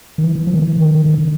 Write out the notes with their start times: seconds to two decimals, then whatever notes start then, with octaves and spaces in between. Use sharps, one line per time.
0.18 D#3
0.23 E3
0.35 E3
0.47 F3
0.54 D#3
0.59 E3
0.77 D#3
0.95 D#3
1.06 D#3
1.18 D3